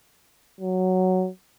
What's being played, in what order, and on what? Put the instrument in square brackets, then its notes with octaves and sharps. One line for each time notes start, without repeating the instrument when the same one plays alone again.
[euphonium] F#3